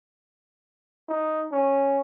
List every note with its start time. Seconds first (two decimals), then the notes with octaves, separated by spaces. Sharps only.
1.09 D#4
1.52 C#4